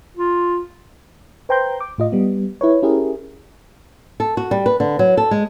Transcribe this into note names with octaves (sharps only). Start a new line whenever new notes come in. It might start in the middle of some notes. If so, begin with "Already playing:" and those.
F4
B4 C5 G5 A#5 C6 G6
D6
A2 F4 D#5
G3 B3
E4 B4 C#5
C#4 E4 G4 G#4 A#4
A4
F#4
G3
B4
D3
F#3
A4
G#3